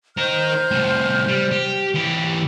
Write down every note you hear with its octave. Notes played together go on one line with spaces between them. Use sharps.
D#4 A#4 C5 F6 G6
C2 A2
G3
G4
E3 G4